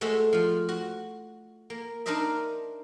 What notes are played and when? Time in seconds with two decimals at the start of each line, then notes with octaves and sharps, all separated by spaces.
0.01 G#3 A3 F#4 A4 C5 E5
0.33 F3 F4
0.69 F#4
1.70 A#3
2.06 D4 D#4 A#4 C5 D#5 E5